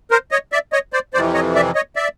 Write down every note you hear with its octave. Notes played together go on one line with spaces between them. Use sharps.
A#4 C5
C#5 D#5
D5 E5
C#5 D#5
C5 D5
F2 C3 E3 C5 D5
C#5 D#5
D5 E5
C#5 D#5
D5 E5